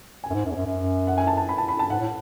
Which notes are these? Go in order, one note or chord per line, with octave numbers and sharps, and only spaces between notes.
G#5
F#2
G#2
F#2
E2
F#2
F#2
F#5
G#5
A5
A5
B5
A5
B5
A5
G#2 F#5
A2